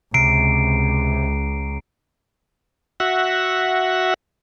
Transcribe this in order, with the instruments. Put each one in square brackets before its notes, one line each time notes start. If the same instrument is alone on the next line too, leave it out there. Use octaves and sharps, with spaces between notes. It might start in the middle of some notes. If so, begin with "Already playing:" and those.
[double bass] C#2 [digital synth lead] C3 [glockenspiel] A#5 C7 D7
[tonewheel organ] F#4 E5 F#5